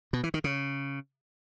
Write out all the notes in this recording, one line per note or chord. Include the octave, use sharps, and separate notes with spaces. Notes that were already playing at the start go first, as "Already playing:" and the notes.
B2
E3
D#3
C#3